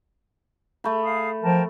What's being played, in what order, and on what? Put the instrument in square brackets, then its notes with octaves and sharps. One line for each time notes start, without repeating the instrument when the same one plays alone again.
[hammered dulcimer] A3 B5
[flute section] G#4 F5 D#6
[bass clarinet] F3 [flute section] A#4 G5 A5